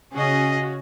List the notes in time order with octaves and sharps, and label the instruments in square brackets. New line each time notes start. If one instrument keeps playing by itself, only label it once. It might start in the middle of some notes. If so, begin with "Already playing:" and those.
[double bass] C#3 [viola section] C#4 F#4 [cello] G#4 D#5